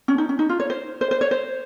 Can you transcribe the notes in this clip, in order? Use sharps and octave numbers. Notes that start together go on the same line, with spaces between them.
C#4
D#4
C#4
D#4
F4
C#5
C5
C5
C5
C#5
C5